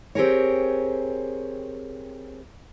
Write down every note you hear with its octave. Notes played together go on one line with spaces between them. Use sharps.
C4 G4 G#4 A#4 C#5